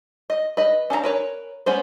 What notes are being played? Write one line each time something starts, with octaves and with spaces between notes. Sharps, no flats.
D#5
B4 D#5
C#4 D4 E5 A#5
A#4 B4 C#5
G#3 B3 C#4 C5